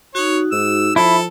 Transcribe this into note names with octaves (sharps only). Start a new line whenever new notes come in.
D#4 F#4 C#5
G#2 E6
F3 E4 A4